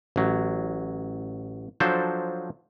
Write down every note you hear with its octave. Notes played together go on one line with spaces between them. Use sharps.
A1 F#3
F3 F#3 D4 A4 C5